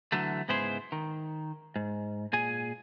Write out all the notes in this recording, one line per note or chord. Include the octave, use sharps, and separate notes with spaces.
D3 E3 F#3 A3
C#2 G#2 B3 E4 G#4 C5
D#3
G#2
A#2 G#4 G#5